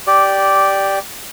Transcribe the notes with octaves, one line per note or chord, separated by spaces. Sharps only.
G4 D5